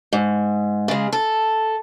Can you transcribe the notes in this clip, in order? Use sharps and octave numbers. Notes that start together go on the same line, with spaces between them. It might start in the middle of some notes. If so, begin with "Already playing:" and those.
G#2
C#3 G#3
A4